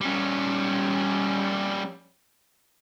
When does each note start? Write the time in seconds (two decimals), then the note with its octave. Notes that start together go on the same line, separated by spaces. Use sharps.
0.01 G3 C#4